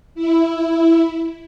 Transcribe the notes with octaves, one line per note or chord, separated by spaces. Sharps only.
E4